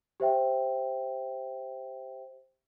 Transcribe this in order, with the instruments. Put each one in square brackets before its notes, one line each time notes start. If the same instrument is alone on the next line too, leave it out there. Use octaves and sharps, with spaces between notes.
[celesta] G4 C5 E5 G5